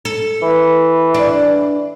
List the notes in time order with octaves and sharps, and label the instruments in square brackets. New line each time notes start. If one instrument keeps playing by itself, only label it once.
[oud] A4
[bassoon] E3
[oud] D4